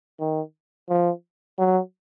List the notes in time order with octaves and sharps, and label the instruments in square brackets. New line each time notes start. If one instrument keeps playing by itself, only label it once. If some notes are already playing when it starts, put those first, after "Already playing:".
[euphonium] D#3
F3
F#3